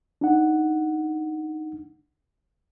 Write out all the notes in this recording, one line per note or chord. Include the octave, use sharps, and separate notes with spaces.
D4 D#4 F#5